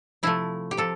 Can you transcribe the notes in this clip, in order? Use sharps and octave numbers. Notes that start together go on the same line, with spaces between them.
C3 F3 A3 E4
G4
C3 F3 A4